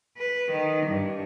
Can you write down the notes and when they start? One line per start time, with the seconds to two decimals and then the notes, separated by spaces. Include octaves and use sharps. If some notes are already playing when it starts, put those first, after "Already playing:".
0.17 B4
0.51 D#3
0.86 G2